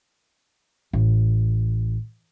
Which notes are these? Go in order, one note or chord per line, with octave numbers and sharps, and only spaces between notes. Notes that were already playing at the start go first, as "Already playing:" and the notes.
A1